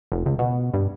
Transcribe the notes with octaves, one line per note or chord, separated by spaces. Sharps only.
F1
C#2
B2
G2